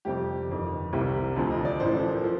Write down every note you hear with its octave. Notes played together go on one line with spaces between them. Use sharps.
F2 C3 G3 G4
G1 F2 D#3
C2 C3 G3
D2 D3 F3 A4
D#5
D5
A1 A2 F3 C5
A4
A#4
F3